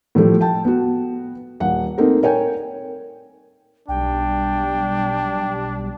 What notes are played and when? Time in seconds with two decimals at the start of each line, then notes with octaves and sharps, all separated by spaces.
0.15 A2 F3 G3 A3
0.41 G5 A5
0.65 B3 F#4
1.60 D#1 F#5
1.98 A3 A#3 C4 D#4
2.23 A#4 C#5 G5 G#5
3.88 B1 G3 D4 G5